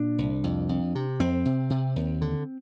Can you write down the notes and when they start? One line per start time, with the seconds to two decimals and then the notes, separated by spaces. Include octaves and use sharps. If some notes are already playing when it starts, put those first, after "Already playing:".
Already playing: A#2 D4
0.18 C2
0.44 F2
0.69 F2
0.95 C3
1.20 F2 C4
1.45 C3
1.70 C3
1.96 D#2
2.21 D3